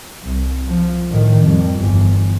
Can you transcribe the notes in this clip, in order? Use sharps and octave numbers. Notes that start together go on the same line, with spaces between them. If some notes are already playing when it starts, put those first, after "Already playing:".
C2
F3
A2 D#3
F2 G3
G1 E2